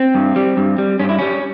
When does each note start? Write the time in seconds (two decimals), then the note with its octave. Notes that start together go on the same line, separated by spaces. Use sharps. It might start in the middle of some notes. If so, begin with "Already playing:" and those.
Already playing: C4
0.15 G2
0.36 G3
0.57 G2
0.78 G3
1.00 G2 C#4
1.09 E4
1.19 G3 C#4